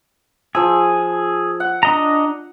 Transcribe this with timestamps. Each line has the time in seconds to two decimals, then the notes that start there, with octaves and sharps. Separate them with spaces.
0.55 F3 G#4 E6
1.60 F#5
1.83 D4 D#5 A#5